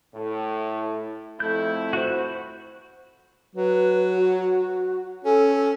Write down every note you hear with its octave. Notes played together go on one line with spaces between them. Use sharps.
A2
F2 A3 E4 G6
F#4 C5
F#3 B4
F#4
C#4 A4